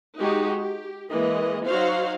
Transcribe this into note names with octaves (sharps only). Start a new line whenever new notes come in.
G#3 D#4 F#4 G4
G4
E3 G#3 A#3 D#5
F#3 D#4 F#4 C5 F5